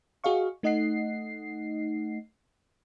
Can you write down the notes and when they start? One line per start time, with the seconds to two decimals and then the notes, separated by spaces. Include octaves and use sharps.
0.24 F#4 G#4 D#5 F5 C#6
0.63 A3 D#4 D#5 F#5 C7